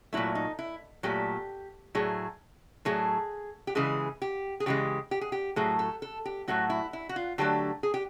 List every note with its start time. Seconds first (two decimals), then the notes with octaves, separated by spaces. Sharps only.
0.13 A#2 F#3 A3 E4
0.35 D#4
0.59 E4
1.03 A#2 F#3 A3 G4
1.95 A2 F#3 A3 G#4
2.85 A2 F#3 A3 G#4
3.67 G4
3.75 C#3 E3 G#3 G#4
4.22 G4
4.60 G#4
4.66 C#3 E3 G#3 G4
5.11 G4
5.21 G#4
5.32 G4
5.56 A2 F#3 A3 G#4
5.79 A4
6.02 A4
6.25 G4
6.48 A2 F#3 A3 F#4
6.70 E4
6.93 E4
7.09 F#4
7.16 F4
7.38 D3 F#3 A3 G4
7.83 G#4
7.94 G4